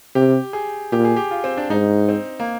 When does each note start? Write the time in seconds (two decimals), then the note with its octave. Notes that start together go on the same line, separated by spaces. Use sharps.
0.15 C3 G4
0.53 G#4
0.92 A#2 G4
1.05 G#4
1.17 G4
1.31 F4
1.44 C4
1.57 D4
1.70 G#2 D#4
2.09 C4
2.40 A#3